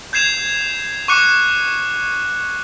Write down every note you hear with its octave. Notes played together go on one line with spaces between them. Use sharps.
G6 G#6 C7 E7 F7
C#6 D6 F#6 C#7